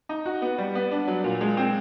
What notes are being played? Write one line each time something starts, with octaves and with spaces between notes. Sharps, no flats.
D#4
F#4
B3
G3
B3
D4
F#3
A#2
G#3
C4